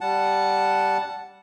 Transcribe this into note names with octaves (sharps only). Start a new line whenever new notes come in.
G3 F#5 A5